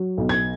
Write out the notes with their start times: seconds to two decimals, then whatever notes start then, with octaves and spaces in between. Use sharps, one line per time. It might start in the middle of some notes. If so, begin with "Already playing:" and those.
Already playing: F#3
0.18 B1
0.29 G#6